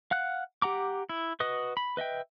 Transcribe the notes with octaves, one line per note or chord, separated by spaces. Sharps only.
F5 F#5 F#6
G4 F#5 A#5 D6
E4
F#4 B4 D#5 D#6
B5
B4 D#5 E5 G5